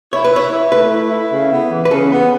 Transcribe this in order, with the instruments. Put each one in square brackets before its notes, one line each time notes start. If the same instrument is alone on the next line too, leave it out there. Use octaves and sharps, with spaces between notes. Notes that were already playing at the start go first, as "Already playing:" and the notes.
[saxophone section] E4 [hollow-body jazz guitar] C#5
[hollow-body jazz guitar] B4
[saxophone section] E4 [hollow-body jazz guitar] C#5
[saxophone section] E4
[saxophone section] A3 [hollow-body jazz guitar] B4
[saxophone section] E4
E4
C#3
B3
E3
[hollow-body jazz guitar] B4
[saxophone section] C#3 [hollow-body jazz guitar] A4
[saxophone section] B3